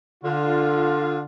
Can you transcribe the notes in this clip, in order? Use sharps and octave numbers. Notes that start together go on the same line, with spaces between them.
D3 F4